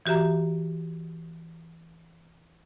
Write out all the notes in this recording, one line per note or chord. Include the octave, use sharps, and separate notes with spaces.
E3 F#4 G4 E5 A#5